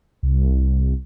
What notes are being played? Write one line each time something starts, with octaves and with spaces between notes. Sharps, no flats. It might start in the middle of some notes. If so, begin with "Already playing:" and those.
C2